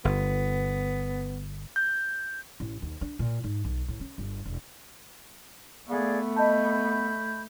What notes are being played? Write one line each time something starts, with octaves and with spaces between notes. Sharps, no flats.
G1 B3
G6
A1
D#2
D4
A#2
G#2
B1
A2
C#4
G1
E1
A3 B3 G#4 D5 F5
D#5 A5 B5 G6